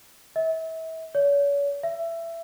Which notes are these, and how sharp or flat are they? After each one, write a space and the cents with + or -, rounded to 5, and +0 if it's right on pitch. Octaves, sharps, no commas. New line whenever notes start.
E5 -35
C#5 +40
E5 +20